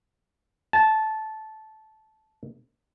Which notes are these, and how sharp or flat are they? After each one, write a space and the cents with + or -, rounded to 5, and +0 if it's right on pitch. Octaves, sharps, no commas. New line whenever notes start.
A5 -15